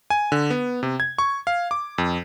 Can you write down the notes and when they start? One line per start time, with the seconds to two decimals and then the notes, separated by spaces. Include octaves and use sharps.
0.10 G#5
0.32 D3
0.50 B3
0.83 C3
1.00 G#6
1.19 C#6
1.47 F5
1.71 D6
1.98 F2